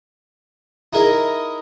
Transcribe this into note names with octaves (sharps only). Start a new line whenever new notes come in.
D#4 E4 G#4 A#4 D#5